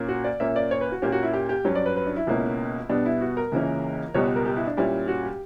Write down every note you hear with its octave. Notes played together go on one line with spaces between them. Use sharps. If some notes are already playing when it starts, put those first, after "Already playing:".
Already playing: A#2 A#3 C#4
F#4
D5
A#2 A#3 C#4 E5
D5
C#5
B4
F#4
A#2 A#3 C#4 G4
F#4
E4
G4
G4
G2 F#3 C#4
D5
B4
B4
D4
E4
C#2 B2 A#3 C#4
B2 G3 B3 D4
E4
F#4
A#4
C#2 C#3 E3 A#3 C#4
C#2 B2 G3 B3 C#5
A#4
G4
E4
D4
A#2 G3 C#4 E4
F#4
G4